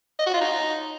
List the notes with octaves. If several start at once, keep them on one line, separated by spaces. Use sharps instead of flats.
D#5
F#4
F4
D#4